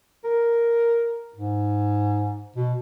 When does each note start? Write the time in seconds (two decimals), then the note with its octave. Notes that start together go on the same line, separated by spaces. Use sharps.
0.24 A#4
1.36 G#2
2.56 B2